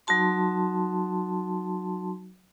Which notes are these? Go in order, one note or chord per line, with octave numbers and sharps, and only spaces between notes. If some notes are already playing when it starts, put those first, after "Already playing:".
F#3 D#4 F#4 A5 C6